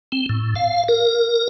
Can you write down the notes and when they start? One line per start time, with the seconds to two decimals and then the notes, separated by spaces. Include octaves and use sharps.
0.12 C4
0.29 A2
0.56 F5
0.88 A#4